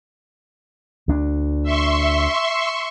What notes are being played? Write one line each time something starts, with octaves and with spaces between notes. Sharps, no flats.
D2 D4
E5 C6 C#6